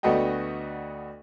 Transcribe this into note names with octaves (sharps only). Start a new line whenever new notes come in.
D2 A3 B3 F#4 D#5 G5